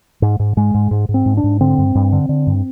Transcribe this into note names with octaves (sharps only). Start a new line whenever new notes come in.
G#2
G#2
G#2 G#3
G#2
G#2
G#2
C4
G#2
D4
G#2
D3 C4
G2
G2
D3
D3
G2